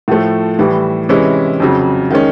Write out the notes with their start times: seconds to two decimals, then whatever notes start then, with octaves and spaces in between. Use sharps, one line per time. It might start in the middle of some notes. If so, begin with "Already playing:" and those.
0.08 A2 F3 A3
0.59 A2 E3 G3
1.09 C3 E3 G#3 C#4 E4
1.60 F2 C#3 F#3
2.10 D#3 G#3 C#4